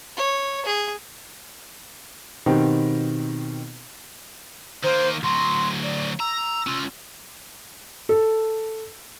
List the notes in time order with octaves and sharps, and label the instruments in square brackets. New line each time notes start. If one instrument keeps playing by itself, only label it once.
[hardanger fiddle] C#5
G#4
[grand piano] B2 D#3 B3 C4 D#4 G4
[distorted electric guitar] D#3 A#3 [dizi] C5
[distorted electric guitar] D2 F#3 [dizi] C6
[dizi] D5
[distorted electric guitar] A#5 [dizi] E6
[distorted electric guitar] C#4 F4
[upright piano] A4